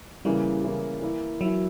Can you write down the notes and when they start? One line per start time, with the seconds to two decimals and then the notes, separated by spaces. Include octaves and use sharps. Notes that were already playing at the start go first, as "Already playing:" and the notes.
0.25 C#3 E3 G3 A#3
0.64 C#3 E3 A#3
1.01 E3 A#3 E4
1.41 E3 F#3 A#3 E4